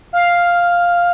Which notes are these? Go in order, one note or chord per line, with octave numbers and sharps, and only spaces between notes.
F5